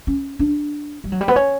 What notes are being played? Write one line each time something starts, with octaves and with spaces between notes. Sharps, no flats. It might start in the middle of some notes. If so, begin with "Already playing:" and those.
C#4
D4
G3
F#3
G3
B3
C#4